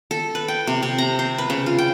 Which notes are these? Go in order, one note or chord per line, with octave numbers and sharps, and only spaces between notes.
A4
B4
G5
C3
C3
A#5
C5
B4
C#3
F4
G5